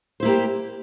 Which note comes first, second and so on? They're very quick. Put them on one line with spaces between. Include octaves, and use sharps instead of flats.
C5 E4 A#3 G4